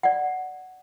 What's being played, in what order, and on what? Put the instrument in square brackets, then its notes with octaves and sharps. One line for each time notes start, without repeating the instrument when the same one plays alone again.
[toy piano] D5 F#5